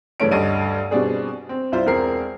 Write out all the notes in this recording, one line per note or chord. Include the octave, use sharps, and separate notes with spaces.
G2 C#3 E3 A3 C#4 D7
D2 G2 D5 D#5 D#7
B2 G3 C4 D4 G#4
C4
C2 E4 F4 C5
E1 C4 A#4 C7